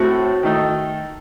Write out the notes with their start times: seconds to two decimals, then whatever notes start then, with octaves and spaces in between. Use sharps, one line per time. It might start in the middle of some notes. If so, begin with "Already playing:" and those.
Already playing: A2 A3 C4 F#4
0.43 D#3 A3 D#4